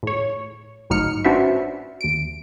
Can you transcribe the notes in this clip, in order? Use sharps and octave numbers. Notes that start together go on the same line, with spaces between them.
A2 C#5
G#1 A2 F#3 D#4 F6 C#7
C#4 D4 F#4 B4 C5 E5
D#2 D7